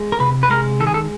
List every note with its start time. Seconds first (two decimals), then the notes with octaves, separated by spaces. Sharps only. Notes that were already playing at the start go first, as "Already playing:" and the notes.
Already playing: G#3
0.12 A#4
0.20 C3 B4
0.43 B4
0.50 G#3 A#4
0.80 D#3 A4
0.87 G#4
0.94 A4